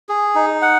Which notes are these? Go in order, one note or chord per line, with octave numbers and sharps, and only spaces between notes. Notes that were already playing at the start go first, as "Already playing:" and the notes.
G#4
D#4
F#5